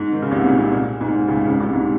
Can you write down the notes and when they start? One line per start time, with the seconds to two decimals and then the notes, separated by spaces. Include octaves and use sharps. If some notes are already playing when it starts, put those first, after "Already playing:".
Already playing: G#2
0.12 D#3
0.22 C#3
0.31 C2 C3
0.44 A#2
0.58 C2 C3
0.71 A#2
1.01 G#2
1.08 A#2
1.28 C#2 C#3
1.47 C#2 C#3
1.60 C2 C3
1.73 G#2